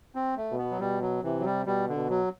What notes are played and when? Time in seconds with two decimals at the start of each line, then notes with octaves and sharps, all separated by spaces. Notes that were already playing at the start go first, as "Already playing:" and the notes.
0.15 C4
0.37 A3
0.51 B2
0.58 B3
0.71 F#3
0.80 B2 G3
1.02 F#3
1.23 C3 E3
1.40 F#3
1.45 G3
1.66 B2 G3
1.88 D3
1.95 B2
2.10 F#3